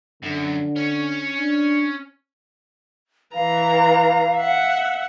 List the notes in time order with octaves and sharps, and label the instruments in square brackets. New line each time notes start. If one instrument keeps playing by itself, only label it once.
[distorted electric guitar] F#2 [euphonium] D3
[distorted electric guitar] C#4 C#5
[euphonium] D4
[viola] E3 A#5 [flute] F5
[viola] E5 F#5